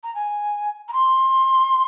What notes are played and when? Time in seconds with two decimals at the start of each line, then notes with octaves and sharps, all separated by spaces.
0.03 A#5
0.15 G#5
0.88 A#5
0.93 C6